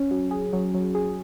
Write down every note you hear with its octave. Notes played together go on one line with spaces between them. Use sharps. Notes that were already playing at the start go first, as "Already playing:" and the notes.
Already playing: C#4
F#3
G#4
F#3
F#3
G#4